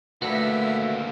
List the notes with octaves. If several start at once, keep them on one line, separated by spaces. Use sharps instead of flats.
D3 A3 A#3 F#4 A4 B4 E5